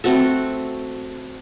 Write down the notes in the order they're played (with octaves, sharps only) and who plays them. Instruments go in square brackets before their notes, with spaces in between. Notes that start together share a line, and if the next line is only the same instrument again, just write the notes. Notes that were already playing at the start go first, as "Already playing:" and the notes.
[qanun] A3 C4 F#4 A4